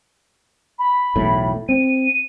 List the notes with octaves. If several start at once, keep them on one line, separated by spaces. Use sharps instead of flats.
B5
B1 E2 A2
C4 D#7